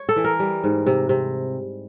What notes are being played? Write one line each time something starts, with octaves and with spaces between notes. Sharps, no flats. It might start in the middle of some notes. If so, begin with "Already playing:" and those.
Already playing: C#5
A4
E3
A#4
G3
G#2
C3
C3